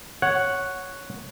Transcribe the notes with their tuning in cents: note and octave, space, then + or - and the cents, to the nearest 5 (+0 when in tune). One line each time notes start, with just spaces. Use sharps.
C#5 +0 F#5 +0